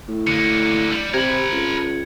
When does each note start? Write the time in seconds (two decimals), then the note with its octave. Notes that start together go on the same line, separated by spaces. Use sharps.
0.09 A2
0.27 D3 A#3 C#7
0.91 G3
1.14 C3 A#4 B5 G#6
1.52 C#2